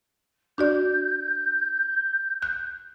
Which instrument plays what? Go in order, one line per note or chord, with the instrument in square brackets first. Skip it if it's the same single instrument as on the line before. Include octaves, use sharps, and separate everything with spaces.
[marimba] D4 F#4 D5 [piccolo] G6
[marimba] F#6